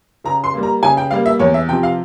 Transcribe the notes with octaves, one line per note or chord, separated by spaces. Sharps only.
C#3 A#5
C6
G3 A#3
A#5
C#3 G#5
G5
G3 A#3 F5
E5
E2 C#5
E5
C3 F3 G5
F5